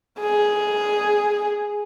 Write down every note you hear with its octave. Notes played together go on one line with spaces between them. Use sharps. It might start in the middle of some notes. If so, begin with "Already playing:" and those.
G#4